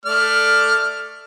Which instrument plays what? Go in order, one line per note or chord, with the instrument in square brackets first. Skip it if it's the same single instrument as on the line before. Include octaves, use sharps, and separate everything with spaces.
[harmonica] A3 D5 F6